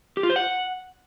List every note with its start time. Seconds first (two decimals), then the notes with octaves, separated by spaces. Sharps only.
0.17 G4
0.23 F4
0.30 C5
0.36 F#5